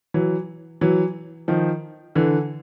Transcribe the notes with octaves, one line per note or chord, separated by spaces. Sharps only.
E3 F#3
E3 F#3
D#3 F3
D3 E3